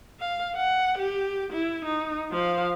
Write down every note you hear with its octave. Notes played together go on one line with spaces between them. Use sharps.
F5
F#5
G4
E4
D#4
F3 F5